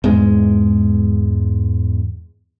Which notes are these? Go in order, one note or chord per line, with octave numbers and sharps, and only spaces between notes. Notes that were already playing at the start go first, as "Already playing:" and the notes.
E2 G#2 G#3